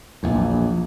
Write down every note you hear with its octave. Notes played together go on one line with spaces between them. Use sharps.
A#1 E2